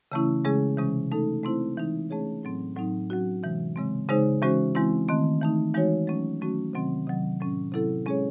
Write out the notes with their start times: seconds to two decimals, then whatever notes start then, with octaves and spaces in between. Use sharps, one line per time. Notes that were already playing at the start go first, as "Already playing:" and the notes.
0.12 C#3 E3 A3 C#4 E4
0.45 C#3 G#3 C#4 G#4
0.78 C3 E3 G#3 C#4
1.12 A3 D#4 A4
1.43 A3 C4 E4 C5
1.77 E3 G#3 D#4
2.10 A3 C#4 G#4 C#5
2.43 A2 F#3 C4
2.76 A2 F#3 C4 D#4
3.10 F#3 C#4 F#4
3.43 C3 E3 G#3
3.76 C#3 G#3 C4
4.09 C#3 G#3 D#4 G#4 C5
4.42 E3 G#3 C#4 F#4 C5
4.75 E3 G#3 C4 E4
5.09 D#3 A3 C4
5.41 E3 A3 D#4
5.74 E3 G#3 D#4 F#4 C#5
6.07 F#3 A3 C#4
6.40 D#3 F#3 A3 C#4 F#4
6.73 C3 D#3 F#3 C4
7.07 C3 D#3 F#3
7.40 A2 F#3 C#4
7.72 C3 F#3 C4 E4 A4
8.06 G#3 C#4 G#4 C#5